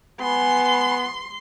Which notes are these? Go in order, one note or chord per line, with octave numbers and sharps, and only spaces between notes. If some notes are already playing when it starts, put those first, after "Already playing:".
B3 G#5 B5 C6